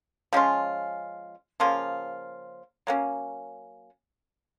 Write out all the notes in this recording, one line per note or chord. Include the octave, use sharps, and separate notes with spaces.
F3 G#3 C#4 F4
C#3 F3 A#3 F4
F#3 A#3 C#4